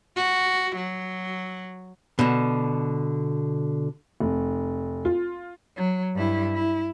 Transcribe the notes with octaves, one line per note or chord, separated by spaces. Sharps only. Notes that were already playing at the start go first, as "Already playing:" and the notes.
F#4
F#3
B2 D3
F1
F4
F#3
G2 E4
E4